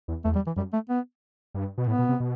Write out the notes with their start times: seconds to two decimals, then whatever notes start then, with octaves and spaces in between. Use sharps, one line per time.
0.08 E2
0.24 E2 A3
0.35 G3
0.46 E3
0.56 F#2 G3
0.73 A3
0.89 B3
1.54 G2
1.78 B2
1.87 A2 B3
1.99 B2
2.09 C3
2.20 B2